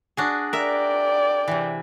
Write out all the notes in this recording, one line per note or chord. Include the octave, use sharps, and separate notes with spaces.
D4 F#4 G#4
A#4 D5 E5 G5
C3 E3